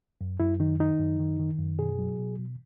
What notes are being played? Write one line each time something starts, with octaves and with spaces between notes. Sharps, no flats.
F#2
F#2 E4
D#3 D#4
D#3 D#4
F#2
D#3
D#3
F#2
B2 G#4
F#3
B2
B2